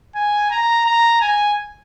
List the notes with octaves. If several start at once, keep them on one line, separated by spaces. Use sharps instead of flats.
G#5
A#5
A#5
G#5